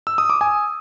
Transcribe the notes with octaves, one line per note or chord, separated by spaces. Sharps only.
E6
D#6
D6
G#5